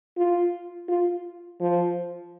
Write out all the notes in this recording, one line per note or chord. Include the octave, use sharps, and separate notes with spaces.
F4
F4
F3